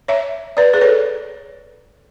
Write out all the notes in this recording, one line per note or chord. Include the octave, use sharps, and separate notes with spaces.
C#5 E5
B4 D5
G#4 B4
A4 C#5